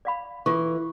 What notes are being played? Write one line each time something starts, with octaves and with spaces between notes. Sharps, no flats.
D5 F5 B5
E3 F4 A4 C#6